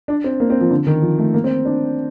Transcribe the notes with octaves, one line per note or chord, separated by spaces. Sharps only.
D4
C4
A#3
C4
F3
D3
D#3
F3
A3
A#3
C4
D4